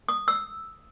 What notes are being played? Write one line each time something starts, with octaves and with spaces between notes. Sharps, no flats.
D#6
E6